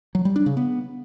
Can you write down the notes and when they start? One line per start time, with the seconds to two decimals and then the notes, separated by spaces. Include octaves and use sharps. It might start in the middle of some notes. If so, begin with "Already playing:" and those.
0.15 F#3
0.25 G3
0.36 D4
0.46 C#3
0.57 B3